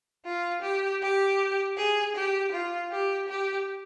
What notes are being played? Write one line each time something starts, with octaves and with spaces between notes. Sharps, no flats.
F4
G4
G4
G#4
G4
F4
G4
G4